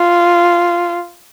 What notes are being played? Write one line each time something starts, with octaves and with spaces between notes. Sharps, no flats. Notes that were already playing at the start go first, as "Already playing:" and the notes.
Already playing: F4